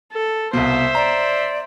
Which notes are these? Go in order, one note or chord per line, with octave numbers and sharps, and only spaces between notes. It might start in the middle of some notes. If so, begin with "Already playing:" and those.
A4
C2 B2 C5 E5 F5
D5 A#5